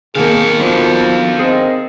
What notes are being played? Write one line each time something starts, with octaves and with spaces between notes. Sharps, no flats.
D#3 A#3 G#4 A4 F5
F3 B3 D4 F#4
C4 G#4 A#4 D#5